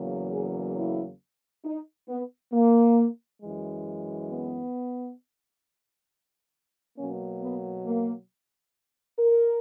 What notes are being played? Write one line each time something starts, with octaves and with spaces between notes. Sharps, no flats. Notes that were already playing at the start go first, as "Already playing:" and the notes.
Already playing: E2 C#3 F#3 A#3
G#4
E4
D#4
B3
A#3
F#2 E3 G#3
B3
B2 F#3 A#3 C#4
B3
A#3
A#4